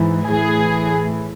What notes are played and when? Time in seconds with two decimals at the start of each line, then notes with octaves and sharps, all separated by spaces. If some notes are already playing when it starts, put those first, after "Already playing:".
Already playing: G#2 E3
0.26 A2 E3 G#4